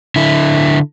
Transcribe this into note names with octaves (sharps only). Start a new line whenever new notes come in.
D3 E4